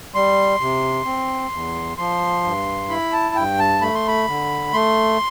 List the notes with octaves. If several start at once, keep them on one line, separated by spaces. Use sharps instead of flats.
G3 C6
C3
C4
E2
F3 C6
G2
E4 B5
A5
G2 G5
A5
A3 B5
C6
B5
D3
A3 C6